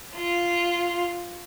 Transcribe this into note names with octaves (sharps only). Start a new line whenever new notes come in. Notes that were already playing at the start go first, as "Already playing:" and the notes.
F4